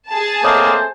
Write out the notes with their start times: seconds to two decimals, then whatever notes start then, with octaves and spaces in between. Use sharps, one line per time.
0.10 G#4 A5
0.44 A3 A#3 C4 C5 C#5 D#5 D#6